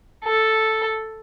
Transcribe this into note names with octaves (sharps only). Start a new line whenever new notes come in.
A4